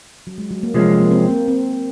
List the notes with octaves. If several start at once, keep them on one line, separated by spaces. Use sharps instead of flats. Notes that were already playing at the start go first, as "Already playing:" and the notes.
F#3
G#3
F#3
A#3
C3 F3 G#3 C4 C#4
A#3
C4
A#3
C4